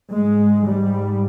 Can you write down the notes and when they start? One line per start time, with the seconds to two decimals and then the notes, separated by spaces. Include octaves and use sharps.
0.12 G#2 G#3
0.67 G3